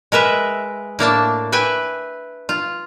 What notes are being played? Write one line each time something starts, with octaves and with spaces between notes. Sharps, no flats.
G#3 A#4 B4 E5
A2 A#3 D4 A5
B4 E5 G5 G#5
F4